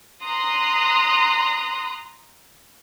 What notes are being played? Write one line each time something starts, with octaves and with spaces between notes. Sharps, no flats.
A#5 C6 D#6 F#6